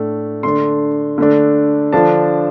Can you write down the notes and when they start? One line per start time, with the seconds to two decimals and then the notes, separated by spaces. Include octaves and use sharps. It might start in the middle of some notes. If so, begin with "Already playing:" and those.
Already playing: A2 A3 D4
0.43 D3 A3 D4 C6
1.18 D3 A3 D4
1.93 D3 F3 D4 A5